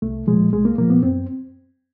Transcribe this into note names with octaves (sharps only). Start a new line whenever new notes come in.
C2 A3
A#2 F3 G#3
C2 G#3
A#3
A#2 F3 A#3
B3
F#2 C4